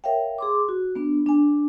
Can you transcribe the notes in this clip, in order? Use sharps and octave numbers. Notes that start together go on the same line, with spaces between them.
A#4 C#5 E5 F5 G5
G#4 C6 D6
F#4
B3 D4
D4 G#5